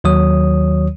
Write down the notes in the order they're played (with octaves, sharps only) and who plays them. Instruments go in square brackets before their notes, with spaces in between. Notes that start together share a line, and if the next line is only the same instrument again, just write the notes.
[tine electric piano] D#2 D#3 F#3 C#5 D#6